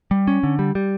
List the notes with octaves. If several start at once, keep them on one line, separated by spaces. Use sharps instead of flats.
G3
C#4
D3
G3
G3